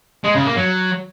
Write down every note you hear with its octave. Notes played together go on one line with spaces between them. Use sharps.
G#3
C#3
A#3
F#3